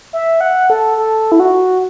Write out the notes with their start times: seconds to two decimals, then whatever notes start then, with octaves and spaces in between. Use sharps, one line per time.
0.13 E5
0.41 F#5
0.70 A4
0.98 A4
1.32 E4
1.40 F#4